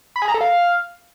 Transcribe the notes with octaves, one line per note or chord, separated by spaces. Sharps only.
B5
G#4
A#5
A4
F5